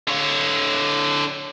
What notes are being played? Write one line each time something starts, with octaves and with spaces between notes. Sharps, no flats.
D3 C#5